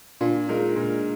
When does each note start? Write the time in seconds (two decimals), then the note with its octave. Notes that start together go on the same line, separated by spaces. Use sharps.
0.21 A#2 D4 F4
0.49 G#3 D#4 A#4
0.76 A#2